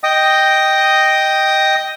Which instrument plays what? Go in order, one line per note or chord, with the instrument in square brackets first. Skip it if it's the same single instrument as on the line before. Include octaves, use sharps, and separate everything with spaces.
[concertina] D#5 G5 D#6